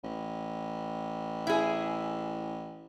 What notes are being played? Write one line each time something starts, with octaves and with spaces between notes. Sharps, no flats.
A1
E4 G#4